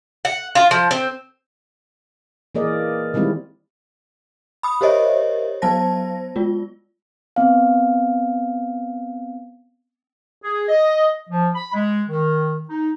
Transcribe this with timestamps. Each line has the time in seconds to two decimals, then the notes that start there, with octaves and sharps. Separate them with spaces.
0.25 F#5
0.55 F4
0.71 F3
0.91 C4
2.55 E3 A#3 G#4 A#4 D5 D#5
3.14 D#3 G3 G#3 C4 E4
4.63 B5 D#6
4.81 G4 A#4 C5 C#5 D#5 E5
5.62 F#3 B3 C5 A5 A#6
6.36 G#3 F4
7.36 B3 C4 F5
10.43 G#4
10.69 D#5
11.30 F3
11.55 B5
11.74 G#3
12.08 D#3
12.69 D#4